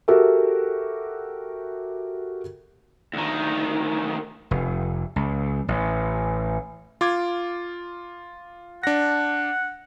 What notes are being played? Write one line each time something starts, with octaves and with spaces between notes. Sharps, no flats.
F#4 G4 A4 A#4 E5
D2 D#3
F1
C#2
A1
F4 D6 G#6
D4 F#5 A#6